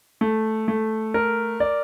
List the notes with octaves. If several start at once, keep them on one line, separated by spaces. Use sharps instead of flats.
A3
A3
A#4
D5